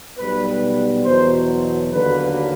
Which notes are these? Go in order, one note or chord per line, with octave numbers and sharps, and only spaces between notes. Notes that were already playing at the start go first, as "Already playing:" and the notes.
B1 B2 G3 B3 B4
E2 B2 F#3 C5
D#2 D3 F#3 A#3 B4